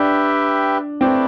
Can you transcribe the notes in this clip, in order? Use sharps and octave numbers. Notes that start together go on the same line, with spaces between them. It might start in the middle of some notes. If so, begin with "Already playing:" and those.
Already playing: D4 G4 B4 E5 G5
A3 C4 E4 B4 D5 G5